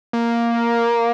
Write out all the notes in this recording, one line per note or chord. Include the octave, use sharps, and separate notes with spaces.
A#3